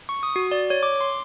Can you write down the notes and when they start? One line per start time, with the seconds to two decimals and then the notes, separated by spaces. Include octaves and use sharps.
0.09 C#6
0.23 D#6
0.36 F#4
0.51 D5
0.70 C#5
0.83 D6
1.01 C6